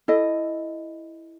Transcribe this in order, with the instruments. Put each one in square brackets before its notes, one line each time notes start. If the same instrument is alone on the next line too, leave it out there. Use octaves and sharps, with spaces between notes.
[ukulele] E4 A4 D#5